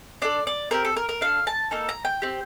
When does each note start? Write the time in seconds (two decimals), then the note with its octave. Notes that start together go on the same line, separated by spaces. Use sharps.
0.22 D4 A4 D5
0.47 D5
0.71 C4 G4 A#4
0.85 A4
0.96 A#4
1.09 A#4
1.21 D4 A4 F5
1.47 A5
1.71 A#3 D#4 A4
1.89 A#5
2.05 G5
2.22 C4 G4